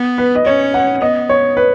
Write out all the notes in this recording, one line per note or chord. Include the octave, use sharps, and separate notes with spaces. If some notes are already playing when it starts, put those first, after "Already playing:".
Already playing: B3
B4
D#5
C#4 C#5
F#5
B3 D#5
C#5
B4